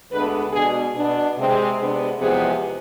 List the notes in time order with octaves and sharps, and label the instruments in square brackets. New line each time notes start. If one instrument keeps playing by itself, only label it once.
[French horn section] D2 D3 G#3 B3 D4 B4
B2 G#3 D4 G#4
B2 B3 D4
C3 G#3 C4
C3 G#3 B3 D4
E2 C3 F3 G#3 B3 G#4